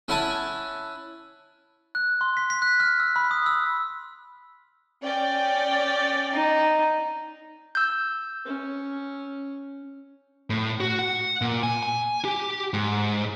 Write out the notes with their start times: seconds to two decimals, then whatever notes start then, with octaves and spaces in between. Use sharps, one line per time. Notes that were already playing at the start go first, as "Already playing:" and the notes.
0.08 C#4 E4 F#5 G#5 A5
1.95 F#6
2.21 C6
2.37 B6
2.50 B6
2.62 F#6
2.80 F6
3.00 E6
3.16 B5
3.31 D#6
3.46 E6
5.03 C#4 D5 G5
6.34 D#4
7.75 E6 G6
8.45 C#4
10.50 A2
10.80 F#4
10.99 F#5
11.41 A#2
11.63 G#5
11.83 G#5
12.25 G4
12.73 G#2